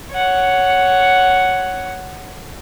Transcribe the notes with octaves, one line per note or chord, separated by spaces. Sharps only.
C#5 F#5